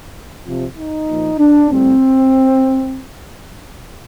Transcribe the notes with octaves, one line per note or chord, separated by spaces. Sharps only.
C3 F3
D#4
A#2 F3
D4
A2 G3 C4